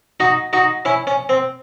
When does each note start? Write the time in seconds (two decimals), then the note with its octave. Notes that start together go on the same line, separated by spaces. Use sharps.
0.20 D#4 F#4
0.53 D#4 F#4
0.85 C#4 E4
1.07 C#4
1.29 C4